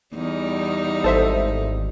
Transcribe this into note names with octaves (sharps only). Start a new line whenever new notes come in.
E2 G3 D#4
G#1 A4 C5 E5